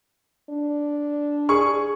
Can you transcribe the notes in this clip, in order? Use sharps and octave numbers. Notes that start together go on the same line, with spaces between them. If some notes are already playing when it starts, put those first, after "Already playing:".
D4
G#4 C#6